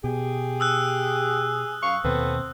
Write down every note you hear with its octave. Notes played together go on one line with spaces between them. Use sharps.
B2 G4 G#4
D#6 E6 F#6
F#2 F5 C#6
D#2 B2 B3 C4 A4 B4